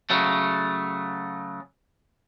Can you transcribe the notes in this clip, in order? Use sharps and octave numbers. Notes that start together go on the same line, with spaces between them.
C#3 F#3 A3